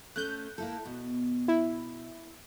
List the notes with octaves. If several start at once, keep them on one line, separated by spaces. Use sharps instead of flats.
A3 C#4 F#6 G6
A#3 E4 A4
B2
E4